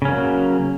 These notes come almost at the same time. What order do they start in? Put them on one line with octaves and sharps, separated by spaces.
C#3 C#4 A#3 F#3